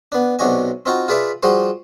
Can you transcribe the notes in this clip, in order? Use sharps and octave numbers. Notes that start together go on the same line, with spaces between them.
B3 D4
B1 C3 D4 F#4 D#5 G#5
C4 D#4 F4 F#4 A#5
F4 G#4 B4 D5 E5
F3 G3 F#4 G#4 C5